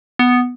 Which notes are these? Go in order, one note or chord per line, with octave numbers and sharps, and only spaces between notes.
B3